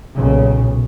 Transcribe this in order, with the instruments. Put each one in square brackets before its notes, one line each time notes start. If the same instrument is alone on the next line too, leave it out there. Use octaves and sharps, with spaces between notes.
[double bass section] B1 A#2 C#3